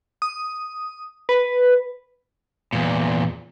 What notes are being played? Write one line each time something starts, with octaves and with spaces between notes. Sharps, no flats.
D#6
B4
E2 A#2